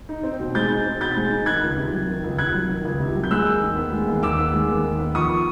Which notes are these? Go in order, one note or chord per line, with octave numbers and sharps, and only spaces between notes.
D#4
C4
B2
G#3 G6 A6
D#4
C4
B2 G6 A6
G#3
D#4
D#3 F#6 G#6
C#2
C3
F#3
D#3
C#2
C3 F#6 G#6
F#3
D#3
C#2
C3
F#3
G6
G#3 E6 F#6
D#2
D#3
B3
G#3
D#2
D#3 D6 E6
B3
G#3
D#2
D#3
B3
F3 C#6 D#6